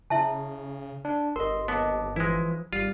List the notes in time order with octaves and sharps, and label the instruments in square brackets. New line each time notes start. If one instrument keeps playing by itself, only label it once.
[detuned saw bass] C#3 [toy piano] E4 E5 A5
[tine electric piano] D4
[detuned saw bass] G1 [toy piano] A#4 [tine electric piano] D#5 C6
[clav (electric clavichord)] D#2 B3 [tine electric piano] D#5 A5 D6
[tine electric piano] E3 F3 [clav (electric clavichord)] G#3 E4
[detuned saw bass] G#1 [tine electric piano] G3 [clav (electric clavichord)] F4